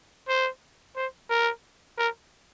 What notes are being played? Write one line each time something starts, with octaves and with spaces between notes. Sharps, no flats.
C5
C5
A#4
A#4